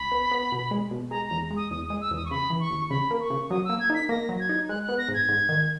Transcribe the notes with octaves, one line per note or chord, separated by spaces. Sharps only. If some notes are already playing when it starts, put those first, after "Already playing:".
Already playing: C#2 B5
B3
B3
B2
G#3
B2
G#3 A#5
E2 A#5
G#3
D#6
E2 D#6
G#3 D#6
E6
E2
D#6
C#6
C#3 B5
E3
C#6
D#2
C#3 B5
A#3
C#6
C#3
F#3 D#6
A#3 E6
G#6
D#4 B6
A#3 A#6
F#3
G#6
D#4
G#3 F#6
B3 F#6
A#6
G#2
G#6
G#2
D#3